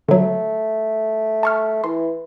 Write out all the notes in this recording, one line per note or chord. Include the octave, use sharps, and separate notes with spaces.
D3 F#3 A3
A5 C#6 F6
E3 C6